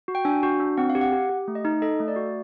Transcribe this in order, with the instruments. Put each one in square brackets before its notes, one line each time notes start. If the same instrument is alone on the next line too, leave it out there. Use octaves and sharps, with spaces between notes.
[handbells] F#4
G5
D4 G#5
F#4
D4
C4 F#5
F5
G4
F#5
G4
G4
A3
D#5
D#4
A4 D#5
A3
D5
F#4